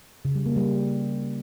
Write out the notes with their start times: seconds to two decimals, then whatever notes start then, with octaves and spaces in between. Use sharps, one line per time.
0.25 C#3
0.35 G3
0.46 A#3
0.56 G3